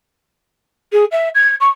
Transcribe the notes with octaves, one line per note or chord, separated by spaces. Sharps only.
G#4
E5
G#6
C#6